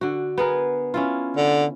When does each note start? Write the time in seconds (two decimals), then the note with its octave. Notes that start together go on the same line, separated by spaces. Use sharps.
0.01 D3 F#4
0.38 B3 G#4 A#4
0.94 C#4 E4 F4
1.37 D3